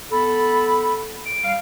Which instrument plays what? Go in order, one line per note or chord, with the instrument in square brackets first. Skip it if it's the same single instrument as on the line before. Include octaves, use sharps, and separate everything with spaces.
[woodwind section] B3 A4 [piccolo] B5
[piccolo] D7
[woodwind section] G3 F5